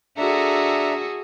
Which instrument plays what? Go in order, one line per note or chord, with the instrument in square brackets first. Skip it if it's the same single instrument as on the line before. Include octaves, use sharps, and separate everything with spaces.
[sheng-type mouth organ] D4 E5 A#5 [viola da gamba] F#4 G#4 A4